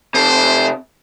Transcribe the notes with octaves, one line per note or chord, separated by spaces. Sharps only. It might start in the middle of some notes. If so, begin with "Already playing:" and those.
C3 A4 C5